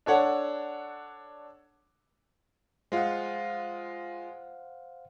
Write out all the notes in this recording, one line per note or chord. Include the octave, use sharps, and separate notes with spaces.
D4 A4 C#5 F#5
G#3 F4 C5 F5 F#5